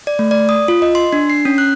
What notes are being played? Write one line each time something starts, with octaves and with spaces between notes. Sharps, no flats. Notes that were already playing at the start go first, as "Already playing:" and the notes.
D5
A3
D5
D#6
F4
D#5
C6
D4
C7
C#4
F#6